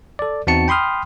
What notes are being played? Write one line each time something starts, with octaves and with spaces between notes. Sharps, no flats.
A4 D5
E2 C4 D#4 F#4 A5 C#7
G5 B5 C6 D#6 F6